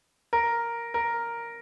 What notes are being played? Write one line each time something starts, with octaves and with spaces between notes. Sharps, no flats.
A#4
A#4